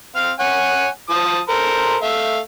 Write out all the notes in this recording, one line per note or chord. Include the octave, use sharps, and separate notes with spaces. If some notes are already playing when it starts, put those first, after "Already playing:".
C4 F5 F6
C#5 F#5 G#5
F3 A5 D#6
A4 A#4 C5
A3 E5 F5